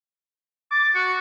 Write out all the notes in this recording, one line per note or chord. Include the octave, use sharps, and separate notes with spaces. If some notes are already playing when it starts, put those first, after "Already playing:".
D6 A6
F#4 C#7